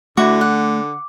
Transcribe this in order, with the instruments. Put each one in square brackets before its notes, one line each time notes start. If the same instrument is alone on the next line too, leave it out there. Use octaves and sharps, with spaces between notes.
[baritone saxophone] D3 [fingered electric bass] A3 [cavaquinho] E4 F#4 [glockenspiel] D6
[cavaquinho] F#5